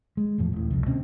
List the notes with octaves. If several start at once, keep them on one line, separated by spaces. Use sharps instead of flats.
G#3
E1 E2 A2 F3
D#1 A2
C2 F2
D2 B2 C4 C#4